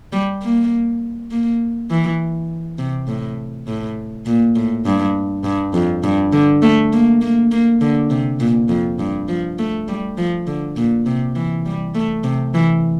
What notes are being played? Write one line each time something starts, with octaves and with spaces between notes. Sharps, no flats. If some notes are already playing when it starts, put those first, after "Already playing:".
G3
A#3
A#3
E3
C3
A2
A2
A#2
A2
G2
G2
F2
G2
D3
A3
A#3
A#3
A#3
D3
C3
A#2
F2
G2
F3
A3
G3
F3
D3
A#2
C3
E3
G3
A3
C3
E3